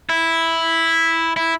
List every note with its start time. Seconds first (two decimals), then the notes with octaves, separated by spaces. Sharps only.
0.09 E4
1.36 E4